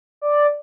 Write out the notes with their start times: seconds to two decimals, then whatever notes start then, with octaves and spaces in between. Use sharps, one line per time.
0.21 D5